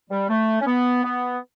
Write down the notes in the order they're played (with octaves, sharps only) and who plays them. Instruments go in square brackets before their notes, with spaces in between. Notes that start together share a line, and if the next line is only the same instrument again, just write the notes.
[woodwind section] G3
A3
C#4
B3
B3